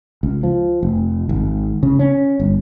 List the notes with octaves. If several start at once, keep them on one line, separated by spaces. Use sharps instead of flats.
C#2
F3
F1
G#1
C#3
C#4
G1